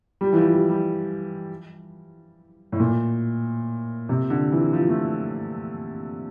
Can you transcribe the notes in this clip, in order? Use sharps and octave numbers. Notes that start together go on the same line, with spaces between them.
G3
E3
F3
G3
G3
A2
A#2
C3
D3
E3
F3
A3